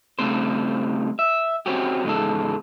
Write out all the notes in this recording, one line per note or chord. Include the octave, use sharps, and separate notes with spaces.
C#3 G3 A3 C4 C5
E5
C4 C#4 F#4 G4
E2 G#2 C#3 G#3 A4